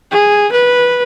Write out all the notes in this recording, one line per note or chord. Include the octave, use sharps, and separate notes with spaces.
G#4
B4